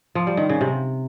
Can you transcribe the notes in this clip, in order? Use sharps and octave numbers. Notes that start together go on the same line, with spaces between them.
F3
G3
D#3
C#3
C3